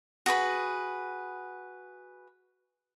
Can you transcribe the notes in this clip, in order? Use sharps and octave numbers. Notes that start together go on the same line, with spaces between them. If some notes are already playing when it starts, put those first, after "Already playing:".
F#4 G#4 B4 B5